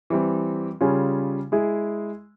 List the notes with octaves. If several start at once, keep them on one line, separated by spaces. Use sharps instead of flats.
E3 G3 C4
C#3 G3 C#4 F4 G#4
G#3 E4 G#4